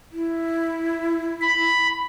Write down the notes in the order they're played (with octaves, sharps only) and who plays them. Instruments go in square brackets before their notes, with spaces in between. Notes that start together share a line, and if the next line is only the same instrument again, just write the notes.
[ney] E4
[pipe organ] B5